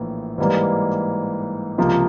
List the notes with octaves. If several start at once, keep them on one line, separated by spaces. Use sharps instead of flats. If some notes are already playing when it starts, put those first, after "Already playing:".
Already playing: A#1 A2 E3 A#3
G#2 E3 G3 A#3
C#2 C3 F3 A#3